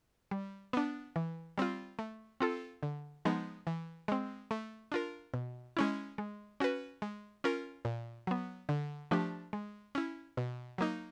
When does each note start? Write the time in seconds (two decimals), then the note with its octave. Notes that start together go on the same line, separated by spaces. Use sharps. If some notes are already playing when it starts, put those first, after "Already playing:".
0.31 G3
0.73 B3 D4
1.16 E3
1.58 G3 C4 F4
1.99 A3
2.40 C4 F4 A4
2.83 D3
3.25 F3 G#3 B3 D#4
3.67 E3
4.08 G#3 C4
4.51 A3
4.92 D4 F4 A#4
5.34 B2
5.77 G#3 C#4 E4
6.18 G#3
6.60 C#4 F#4 B4
7.02 G#3
7.44 C#4 F4 A#4
7.85 A#2
8.27 F#3 B3
8.69 D3
9.11 F3 A3 D4 G4
9.53 G#3
9.95 C#4 E4
10.37 B2
10.78 F#3 A#3 D#4